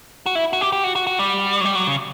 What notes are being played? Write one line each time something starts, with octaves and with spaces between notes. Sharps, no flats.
F#4
E4
F#4
G4
G4
F#4
F#4
F#4
G3
F#3
G3
F#3
C#3